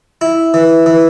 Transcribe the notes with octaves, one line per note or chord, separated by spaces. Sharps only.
E4
E3
E3